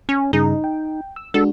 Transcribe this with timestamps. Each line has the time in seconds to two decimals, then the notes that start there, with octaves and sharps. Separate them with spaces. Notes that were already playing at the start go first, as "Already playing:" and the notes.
0.09 C#4
0.33 G2 C#3 D#4 G#4
0.64 G5
1.16 E6
1.34 G#3 D4 F#4 A4